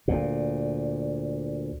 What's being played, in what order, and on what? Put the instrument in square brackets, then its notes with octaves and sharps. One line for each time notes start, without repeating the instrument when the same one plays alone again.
[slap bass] D2 A#2